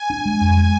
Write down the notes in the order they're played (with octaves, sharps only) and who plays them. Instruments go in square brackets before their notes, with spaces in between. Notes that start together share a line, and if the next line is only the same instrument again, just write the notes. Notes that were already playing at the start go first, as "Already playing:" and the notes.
Already playing: [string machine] G#5
[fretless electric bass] D4
G#3
F2
G#3